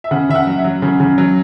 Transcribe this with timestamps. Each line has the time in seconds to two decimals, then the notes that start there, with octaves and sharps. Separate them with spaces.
0.04 E5
0.11 C#3 F#5
0.29 C#3 E5
0.35 F#5
0.47 F#3
0.59 E5
0.64 F#3
0.82 C#3
1.00 C#3
1.18 F#3